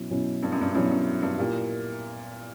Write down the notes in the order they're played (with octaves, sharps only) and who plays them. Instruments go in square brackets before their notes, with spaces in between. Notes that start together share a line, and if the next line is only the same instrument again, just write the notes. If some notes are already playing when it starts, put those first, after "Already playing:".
Already playing: [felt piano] B2 F#3 C#4 E4
B2 F#3 C#4 E4
[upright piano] G2
F#2
G2
[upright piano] G2 [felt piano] B2 F#3 C#4 E4
[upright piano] F#2
G2
[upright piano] A#2 [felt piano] A#3 E4 G4 A#4